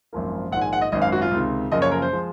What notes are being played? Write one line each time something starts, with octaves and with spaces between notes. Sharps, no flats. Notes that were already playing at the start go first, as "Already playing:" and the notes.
G#1 F#2 F3 A#3
A#1 G#2 D#3 F#5
G#5
F#5
D#5
G#1 F#2 D#3 D#5
F5
F#4
F4
C#2 C3 D#3
F#2 C#3 F3 A#3 D#5
C#5
A#4
C5
F3 G#3